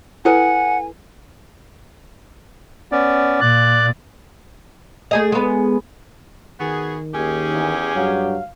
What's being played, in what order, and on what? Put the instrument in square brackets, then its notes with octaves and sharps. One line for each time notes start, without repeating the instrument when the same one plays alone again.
[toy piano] E4 A4 B4 [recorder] F#5 [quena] G#5
[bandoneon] B3 C#4 D5
[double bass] A#2 [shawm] D5 [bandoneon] F#6
[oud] A3 G#4 D#5
G#3 B3
[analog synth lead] D#3 [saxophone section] B3 F#4 G#4
[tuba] D#2 [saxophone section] C#4 G4 G#4
[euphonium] E2
[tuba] G2 [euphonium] F#3 [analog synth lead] F5